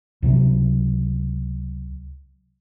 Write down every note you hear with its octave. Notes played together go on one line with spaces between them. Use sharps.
C#2 C3 F#3